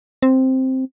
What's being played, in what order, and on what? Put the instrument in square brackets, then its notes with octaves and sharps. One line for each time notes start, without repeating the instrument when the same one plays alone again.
[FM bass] C4